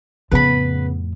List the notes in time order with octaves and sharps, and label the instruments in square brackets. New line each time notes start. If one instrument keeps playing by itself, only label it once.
[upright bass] F2 A2 [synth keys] C#3 B3 [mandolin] B4 B5